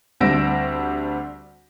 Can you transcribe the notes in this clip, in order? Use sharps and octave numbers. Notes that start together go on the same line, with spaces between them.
D2 G3 C4 E6 A#6 D7